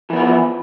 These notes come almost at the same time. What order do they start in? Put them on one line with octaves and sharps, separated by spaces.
E3 B3 E4 F3